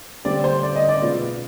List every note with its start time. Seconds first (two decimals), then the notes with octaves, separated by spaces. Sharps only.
0.25 D3 G3 C4 D5
0.44 C5
0.63 D5
0.76 D#5
0.89 D5
1.01 B2 G#3 B3 F4